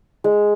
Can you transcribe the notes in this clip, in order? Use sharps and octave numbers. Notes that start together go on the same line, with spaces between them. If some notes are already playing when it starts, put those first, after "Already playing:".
G#3